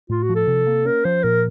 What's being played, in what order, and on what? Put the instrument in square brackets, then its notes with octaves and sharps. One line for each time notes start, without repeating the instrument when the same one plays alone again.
[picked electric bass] A2 [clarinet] F4
[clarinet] F#4
[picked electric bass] F3
[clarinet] A4
[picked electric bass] C3
A#3
[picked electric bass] C#4 [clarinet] A#4
[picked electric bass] F3 [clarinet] C5
[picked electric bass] A#2 [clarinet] A#4